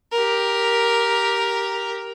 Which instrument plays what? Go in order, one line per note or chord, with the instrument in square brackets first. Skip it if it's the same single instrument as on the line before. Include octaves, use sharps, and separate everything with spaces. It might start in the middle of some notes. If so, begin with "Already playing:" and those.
[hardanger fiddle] G4 A#4